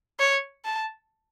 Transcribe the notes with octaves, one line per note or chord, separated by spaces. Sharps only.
C#5
A5